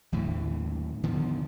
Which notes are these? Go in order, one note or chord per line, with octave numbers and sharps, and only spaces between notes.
D#2 A2 D3 E3
D3 D#3 F3 B3